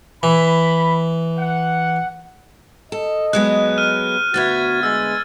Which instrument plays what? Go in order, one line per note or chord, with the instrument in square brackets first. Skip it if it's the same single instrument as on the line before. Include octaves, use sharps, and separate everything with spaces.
[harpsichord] E3 [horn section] B5
[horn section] F#5
[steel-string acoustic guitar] A4 [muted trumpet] D#5
[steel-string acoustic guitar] F#3 G#3 B3 [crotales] F#6
[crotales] F6 D#7
[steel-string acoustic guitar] D2 B3 E5 [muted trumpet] F#4 [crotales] G#6 A6
[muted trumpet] G#3 [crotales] E6 A6